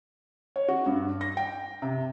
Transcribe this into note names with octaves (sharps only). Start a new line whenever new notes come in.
C#5
F#4
G2
A#6
G5
C3